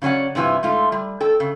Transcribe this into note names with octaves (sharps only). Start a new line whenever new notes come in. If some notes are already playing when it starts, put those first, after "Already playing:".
C#3 F#3 C#4 D5 F#5
G2 C3 E3 F4
G#2 A3 F4
G3
A4 G5
C#3